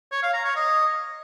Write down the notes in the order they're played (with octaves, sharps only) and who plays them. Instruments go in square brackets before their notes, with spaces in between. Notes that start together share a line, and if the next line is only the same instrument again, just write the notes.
[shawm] C#5
F5
A#5
C#5
D#5